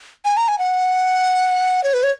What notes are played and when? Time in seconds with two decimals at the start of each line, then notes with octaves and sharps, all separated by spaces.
0.25 G#5
0.37 A#5
0.48 G#5
0.59 F#5
1.84 C#5
1.94 B4
2.03 C#5